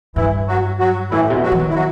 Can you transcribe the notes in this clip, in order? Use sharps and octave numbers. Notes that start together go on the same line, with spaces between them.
G2 E3 E4
F#3 F#4
F#3 F#4
A2 E3 E4
C3
B2
F#3 F#4
E3
D#3
E4
F#3 F#4